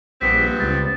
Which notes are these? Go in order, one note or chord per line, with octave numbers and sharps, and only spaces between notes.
A#1 G2 B3 C4 B6
C#2 A6